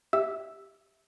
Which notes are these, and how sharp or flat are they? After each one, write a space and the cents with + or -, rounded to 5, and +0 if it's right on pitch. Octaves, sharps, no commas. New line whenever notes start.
G4 +0 E5 -15 E6 +0